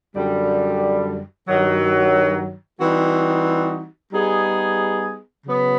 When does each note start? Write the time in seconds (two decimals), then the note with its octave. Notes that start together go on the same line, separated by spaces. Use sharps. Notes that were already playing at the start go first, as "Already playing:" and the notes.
0.15 F#2 D3 G3
1.48 G2 D#3 F#3
2.79 E3 G3 C4 D#4 F#4
4.12 G3 B3 D#4 G#4
5.44 C#3 F#3 B3